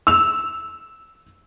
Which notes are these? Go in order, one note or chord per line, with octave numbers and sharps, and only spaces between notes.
E6 F7